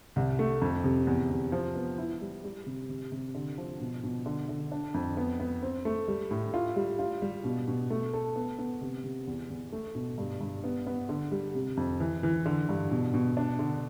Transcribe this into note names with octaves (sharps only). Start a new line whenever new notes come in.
C2
A3
F2
C3
E2
C3
F3
B3
E4
G3
G3
C3
C3
C3
D3
F3
B2
B2
D3
D3
D4
F2
B3
B3
C4
A3
G3
A2
F4
G3
F4
G3
B2
B2
A3
A4
B3
B3
C3
C3
E2
E2
A3
B2
G2
G2
B3
B3
D3
G3
C3
F2
E3
E3
D3
G2
B2
B2
D4
D3